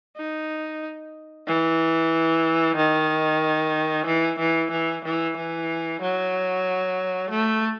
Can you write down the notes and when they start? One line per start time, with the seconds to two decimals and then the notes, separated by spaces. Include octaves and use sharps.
0.17 D#4
1.47 E3
2.76 D#3
4.06 E3
4.39 E3
4.71 E3
5.04 E3
5.37 E3
6.02 F#3
7.30 A3